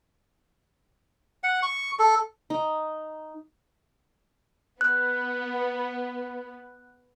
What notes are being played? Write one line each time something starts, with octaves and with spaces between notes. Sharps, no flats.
F#5
C#6
A4
D#4
B3 F#6